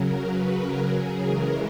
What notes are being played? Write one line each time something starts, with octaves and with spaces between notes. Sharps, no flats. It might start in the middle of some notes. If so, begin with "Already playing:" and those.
Already playing: C#3 F#3 A#4
B4
A#4
G#4
C#3 E3 G#3 A#4